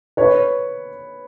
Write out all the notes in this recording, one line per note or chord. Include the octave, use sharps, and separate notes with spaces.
B4 C#5